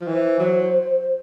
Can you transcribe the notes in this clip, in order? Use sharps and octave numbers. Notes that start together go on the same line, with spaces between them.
F3
E3 C5
F#3